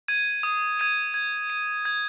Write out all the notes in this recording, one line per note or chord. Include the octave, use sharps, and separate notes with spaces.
G#6 D#7
D#6
G#6 D#7
G#6
D#7
G#6